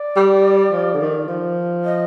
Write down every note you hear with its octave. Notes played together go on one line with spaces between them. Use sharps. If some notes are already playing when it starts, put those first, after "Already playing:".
Already playing: D5
G3
F3
D3
D#3
F3
D#5